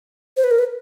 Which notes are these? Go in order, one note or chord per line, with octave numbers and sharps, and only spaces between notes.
C5
B4
A#4
B4